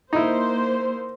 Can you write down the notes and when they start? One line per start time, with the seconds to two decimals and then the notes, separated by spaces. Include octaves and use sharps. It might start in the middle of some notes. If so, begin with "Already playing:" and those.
0.13 A#3 D#4 E4 C5